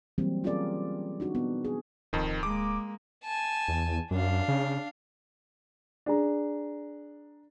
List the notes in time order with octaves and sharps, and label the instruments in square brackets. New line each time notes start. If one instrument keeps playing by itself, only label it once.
[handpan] E3 F#3 G3 A#3 C4
C#4 F4 G4 G#4 A#4 D5
D4 D#4 F#4
B3
G#4
[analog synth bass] D1 [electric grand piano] F2 D#3
[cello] G#3 A#3 [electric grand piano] D6
[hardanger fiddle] G#5 A5
[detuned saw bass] E2
[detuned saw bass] F#2 [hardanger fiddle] D4 F5
[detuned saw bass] C#3
[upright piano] D4 G#4 A#5